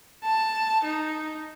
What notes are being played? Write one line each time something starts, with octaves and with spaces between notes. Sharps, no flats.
A5
D#4